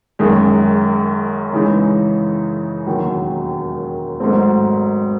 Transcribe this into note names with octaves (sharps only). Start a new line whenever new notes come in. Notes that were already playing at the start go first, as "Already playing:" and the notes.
F#1 F#2 D#3 G#3
C#3 E3 G#3 D#4
E1 D#2 D#3 F#3
G#1 G#2 F#3 A3 C4